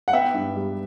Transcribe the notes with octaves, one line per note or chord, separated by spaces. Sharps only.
F#5
B3 E5 G5
G2
G3